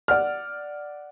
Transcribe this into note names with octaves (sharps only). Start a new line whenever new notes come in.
D5 F#5 F6